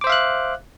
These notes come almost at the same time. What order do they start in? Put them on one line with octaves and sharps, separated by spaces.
D6 C5 E5 F5 F#6